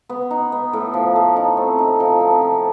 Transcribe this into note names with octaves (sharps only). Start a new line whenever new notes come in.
B3
D#4
B3
A2
F3
A3
D#4
C4
D#4
F3
C4
F3